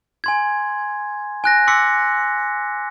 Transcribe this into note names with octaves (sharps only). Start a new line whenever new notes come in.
G#5 C6 G#6
G#5 F#6 A#6
C6 D6 E6 B6 C#7